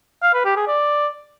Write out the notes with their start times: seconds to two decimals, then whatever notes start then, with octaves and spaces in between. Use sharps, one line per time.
0.23 F5
0.34 B4
0.45 G4
0.56 G#4
0.67 D5